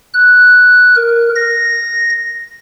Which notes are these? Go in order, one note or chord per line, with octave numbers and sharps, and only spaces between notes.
F#6
A#4
A#6